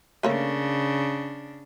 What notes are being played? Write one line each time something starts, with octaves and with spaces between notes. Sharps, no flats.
C#3 A3 A#3 D4 C#5